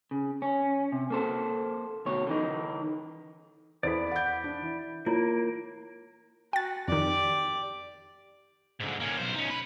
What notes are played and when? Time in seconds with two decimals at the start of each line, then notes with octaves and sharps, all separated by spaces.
0.11 C#3
0.42 C#4
0.92 C3
1.10 A#3 A4 C5
2.06 D2 B2 C#5
2.27 D3 E3 D#4
3.83 E2 A4 C5 D5 B5
4.12 F#5 G6
4.44 D4
4.62 E3
5.06 A#3 E4 F4 C#5
6.53 F#4 G5 A6
6.88 F2 D#3 G4 D5
8.80 G#2 D3
9.00 A#3 C#4
9.17 B1 C5
9.35 C#4 D#4
9.50 B4